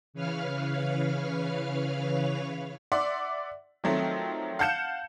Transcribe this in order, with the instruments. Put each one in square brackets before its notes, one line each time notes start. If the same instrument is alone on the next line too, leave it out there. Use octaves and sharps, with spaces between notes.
[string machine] C#3 E3 B4 C#5 F5 F6
[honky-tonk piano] D5 E5 F#5 C6
D#3 F3 F#3 A3 C4
F5 F#5 A5 G6 C#7 E7